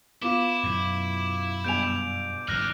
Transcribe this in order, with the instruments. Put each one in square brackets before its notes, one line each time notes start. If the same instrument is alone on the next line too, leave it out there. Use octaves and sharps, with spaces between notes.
[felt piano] B3 F4 [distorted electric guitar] E4 [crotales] D6
[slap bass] F#2 B2
[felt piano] G1 G#5 [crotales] G6 D7 F7
[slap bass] G1 F3 [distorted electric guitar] D#4 D5 [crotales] F6 F#6 A#6